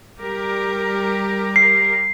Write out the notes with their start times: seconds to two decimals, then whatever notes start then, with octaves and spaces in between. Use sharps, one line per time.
0.21 G3 G4 A#4
1.56 C7